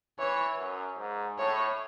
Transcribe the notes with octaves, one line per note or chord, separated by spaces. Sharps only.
E3 C#5
F#2
G#2
A2 C#5